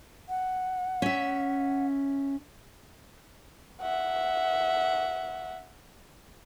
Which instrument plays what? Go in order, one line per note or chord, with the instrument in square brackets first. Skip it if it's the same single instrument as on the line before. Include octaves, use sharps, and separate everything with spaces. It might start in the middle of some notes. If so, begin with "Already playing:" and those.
[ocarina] F#5
[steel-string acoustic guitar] C#4 E5
[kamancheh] E5 F#5